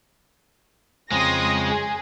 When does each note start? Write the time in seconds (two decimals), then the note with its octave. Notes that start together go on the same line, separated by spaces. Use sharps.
1.11 F2 C#3 G#3 C4 C6 D#6 A#6
1.65 G#4